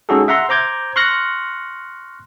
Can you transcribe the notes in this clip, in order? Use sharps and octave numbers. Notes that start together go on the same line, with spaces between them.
G#3 C#4 D#4 F#4 G#4 A4
E5 F#5 A#5 C6
C5 A#5 D6 G6 G#6
C6 C#6 F6 F#6 A#6 C#7